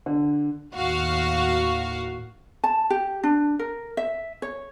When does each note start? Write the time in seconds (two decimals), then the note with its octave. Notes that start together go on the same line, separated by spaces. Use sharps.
0.06 D3
0.75 D#2 A2 F#4 F5
2.64 A5
2.90 G4
3.23 D4
3.59 A#4
3.97 E5
4.42 C#5